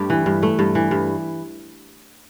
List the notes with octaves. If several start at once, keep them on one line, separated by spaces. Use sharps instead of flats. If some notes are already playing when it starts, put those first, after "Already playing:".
Already playing: G2 A3 G4
E3
G2
A3
G2
E3
G2